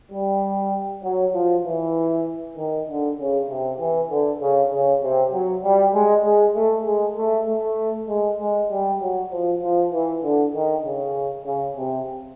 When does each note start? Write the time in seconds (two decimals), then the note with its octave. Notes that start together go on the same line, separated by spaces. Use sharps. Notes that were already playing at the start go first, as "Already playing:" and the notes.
0.12 G3
1.04 F#3
1.35 F3
1.65 E3
2.58 D#3
2.88 D3
3.19 C#3
3.49 C3
3.80 E3
4.10 D3
4.41 C#3
4.72 C#3
5.03 C3
5.33 F#3
5.64 G3
5.94 G#3
6.25 G#3
6.55 A3
6.86 G#3
7.17 A3
7.48 A3
8.09 G#3
8.40 G#3
8.71 G3
9.01 F#3
9.32 F3
9.63 F3
9.93 E3
10.24 D3
10.55 D#3
10.85 C#3
11.46 C#3
11.77 C3